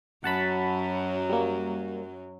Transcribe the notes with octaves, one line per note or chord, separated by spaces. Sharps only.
F#2 F#3 F#5 A5 B5
G3 A#3